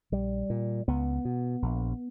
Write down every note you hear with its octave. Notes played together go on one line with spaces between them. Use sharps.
A#1 G3
A#2
C#2 B3
B2
A#1